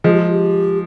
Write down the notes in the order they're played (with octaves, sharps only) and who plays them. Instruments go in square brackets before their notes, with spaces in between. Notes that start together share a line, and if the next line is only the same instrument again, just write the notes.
[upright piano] F3 G#3 [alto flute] G#4
[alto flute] G4
F4
G4